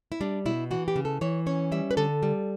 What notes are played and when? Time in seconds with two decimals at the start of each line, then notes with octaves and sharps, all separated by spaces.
0.12 E4
0.21 G3 D4
0.46 B2 E4
0.71 E3 F#4
0.88 G4
0.96 C#3
1.05 A4
1.21 E3 C#5
1.46 C#4 C#5
1.72 G3 E5
1.91 B4
1.97 D3 A4
2.23 G3